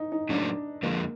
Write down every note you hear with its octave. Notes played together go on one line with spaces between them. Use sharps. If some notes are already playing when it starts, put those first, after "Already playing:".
Already playing: D#4
D#4
A2 F#3 A#3 C#4 D4
F2 D3 F3 G#3 A#3